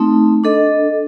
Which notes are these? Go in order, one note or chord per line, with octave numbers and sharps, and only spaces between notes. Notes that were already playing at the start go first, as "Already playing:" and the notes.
Already playing: A3 C4 D#4
D4 A4 D#5